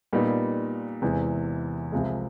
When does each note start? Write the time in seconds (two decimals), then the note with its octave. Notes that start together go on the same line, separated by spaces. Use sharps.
0.13 A#2 G3 B3 D#4
1.02 E2 C3 E3 G#3
1.92 C2 C3 F3 G#3